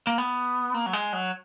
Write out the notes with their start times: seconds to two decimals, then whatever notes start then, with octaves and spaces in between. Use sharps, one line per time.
0.07 A#3
0.18 B3
0.74 A#3
0.86 F#3
0.93 G#3
1.13 F#3